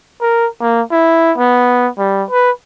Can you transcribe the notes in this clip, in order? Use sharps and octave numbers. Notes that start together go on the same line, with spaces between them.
A#4
A#3
E4
B3
G3
B4